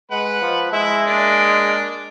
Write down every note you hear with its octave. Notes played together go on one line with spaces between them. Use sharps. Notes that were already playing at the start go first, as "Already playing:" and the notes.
G#3 B4 F#5
F3
G#3 E4 E5
A#3 D4